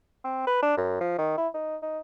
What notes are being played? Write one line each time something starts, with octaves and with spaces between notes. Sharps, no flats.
C4
B4
D4
F#2
F3
D#3
E4
D#4
D#4